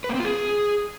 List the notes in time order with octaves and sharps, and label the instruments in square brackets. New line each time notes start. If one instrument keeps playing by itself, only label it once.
[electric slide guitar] B4
A#3
C4
F4
G#4